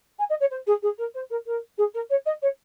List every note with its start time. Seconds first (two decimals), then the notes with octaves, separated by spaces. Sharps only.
0.19 G#5
0.29 D#5
0.40 C#5
0.50 C5
0.67 G#4
0.82 G#4
0.98 A#4
1.14 C5
1.30 A#4
1.46 A#4
1.78 G#4
1.94 A#4
2.10 C#5
2.26 D#5
2.42 C#5